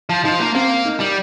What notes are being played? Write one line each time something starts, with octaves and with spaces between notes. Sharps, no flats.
F3
F3 D#4
A#3
A#3 C4
D#4
G3